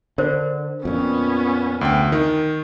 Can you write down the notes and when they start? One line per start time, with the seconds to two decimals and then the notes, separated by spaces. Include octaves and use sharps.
0.18 D3 A#4 C5
0.85 F2 A#2 B3 C#4
1.81 D2 G5
2.12 D#3